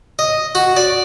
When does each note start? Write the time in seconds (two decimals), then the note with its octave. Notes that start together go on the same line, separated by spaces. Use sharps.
0.19 D#5
0.55 F#4
0.77 D5